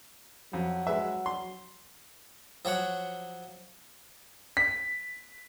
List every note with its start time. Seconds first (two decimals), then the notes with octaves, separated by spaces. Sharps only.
0.53 F2 F#3
0.87 G#3 B4 E5
1.26 C6
2.65 F3 F#3 C#5 F#5
4.57 B6